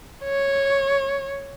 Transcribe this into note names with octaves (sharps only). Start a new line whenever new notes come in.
C#5